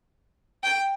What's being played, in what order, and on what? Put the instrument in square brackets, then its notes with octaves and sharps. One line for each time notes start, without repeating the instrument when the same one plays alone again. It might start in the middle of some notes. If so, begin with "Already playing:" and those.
[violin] G5